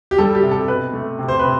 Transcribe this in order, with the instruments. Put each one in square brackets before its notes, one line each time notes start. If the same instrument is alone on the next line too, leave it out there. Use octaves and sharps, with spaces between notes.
[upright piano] G4
G3 A4
G4
C3
A4
B2 B4
A3
C3
C5
C3 B4